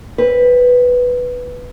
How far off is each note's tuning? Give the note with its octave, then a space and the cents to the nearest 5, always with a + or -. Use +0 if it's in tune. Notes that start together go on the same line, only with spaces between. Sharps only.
C4 +25 B4 +0